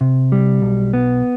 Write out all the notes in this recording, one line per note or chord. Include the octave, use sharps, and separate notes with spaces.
C3
G3
B1
B3